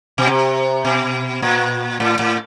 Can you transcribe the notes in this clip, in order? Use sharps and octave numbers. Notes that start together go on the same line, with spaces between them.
B2
C3
B2
A#2
A2
A2